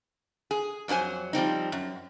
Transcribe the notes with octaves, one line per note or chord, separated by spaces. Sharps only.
G#4
F2 F#3 D4 C5 G#5
F3 G3 C4 D#4
F#2